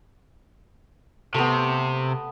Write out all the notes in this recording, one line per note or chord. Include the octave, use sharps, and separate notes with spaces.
C3 A3 B3